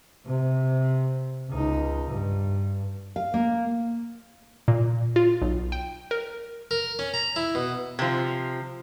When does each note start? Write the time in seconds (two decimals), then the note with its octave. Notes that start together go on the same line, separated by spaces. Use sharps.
0.26 C3
1.49 C#2 D#4
2.11 G2
3.16 F5
3.34 A#3
4.68 A#2
5.16 F4
5.41 B1
5.72 G5
6.11 A#4
6.71 A#4
6.99 C#4
7.14 A#5
7.36 E4
7.55 B2
7.99 C3 F3